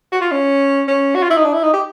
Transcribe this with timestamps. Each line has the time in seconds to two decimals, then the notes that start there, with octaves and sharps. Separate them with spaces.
0.12 F#4
0.21 F4
0.31 C#4
0.88 C#4
1.15 F#4
1.23 F4
1.30 E4
1.37 D#4
1.44 D4
1.54 E4
1.63 D#4
1.73 G4